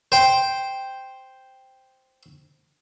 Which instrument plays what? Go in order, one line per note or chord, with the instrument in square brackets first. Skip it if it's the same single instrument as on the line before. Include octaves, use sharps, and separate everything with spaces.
[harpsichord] C5 G5